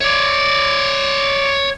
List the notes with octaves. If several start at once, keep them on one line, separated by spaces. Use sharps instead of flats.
C#5 D5